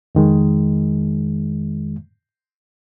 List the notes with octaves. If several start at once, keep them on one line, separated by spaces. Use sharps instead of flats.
F2 D#3 G#3